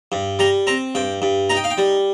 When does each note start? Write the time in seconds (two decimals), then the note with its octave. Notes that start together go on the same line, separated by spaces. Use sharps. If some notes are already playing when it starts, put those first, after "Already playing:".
0.12 G2
0.39 G3 A#5
0.67 C4 A#5
0.95 G2 G5
1.22 G2
1.49 D#4 A#5
1.56 G5
1.64 F5
1.70 G5
1.78 G3